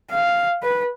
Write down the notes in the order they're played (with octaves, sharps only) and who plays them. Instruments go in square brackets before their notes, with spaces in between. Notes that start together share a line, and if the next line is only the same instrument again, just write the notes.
[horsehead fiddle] F5
B4